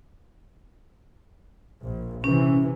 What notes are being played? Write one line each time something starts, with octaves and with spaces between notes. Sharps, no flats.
A#1
C3 E3 C#4